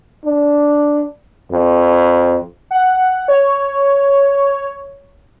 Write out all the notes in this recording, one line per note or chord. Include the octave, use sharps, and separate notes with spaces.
D4
F2
F#5
C#5